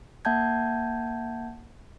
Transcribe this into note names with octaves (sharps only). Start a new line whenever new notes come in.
A#3 E5 F#5 A5 G6 G#6